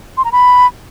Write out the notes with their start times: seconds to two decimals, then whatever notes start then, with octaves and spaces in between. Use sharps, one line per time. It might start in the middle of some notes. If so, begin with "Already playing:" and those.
0.17 C6
0.25 A#5
0.32 B5